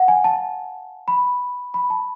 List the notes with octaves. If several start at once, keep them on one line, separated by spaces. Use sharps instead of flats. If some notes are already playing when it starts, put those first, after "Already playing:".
Already playing: F5 F#5
G#5
A5
B5
B5
A5